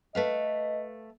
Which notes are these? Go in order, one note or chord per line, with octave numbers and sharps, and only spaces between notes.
A3 B4 D#5 F5